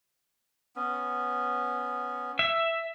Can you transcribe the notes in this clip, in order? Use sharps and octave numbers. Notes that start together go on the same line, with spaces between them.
B3 C#4
E5